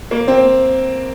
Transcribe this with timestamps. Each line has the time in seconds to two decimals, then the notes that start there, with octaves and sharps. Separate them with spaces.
0.11 A#3
0.28 C4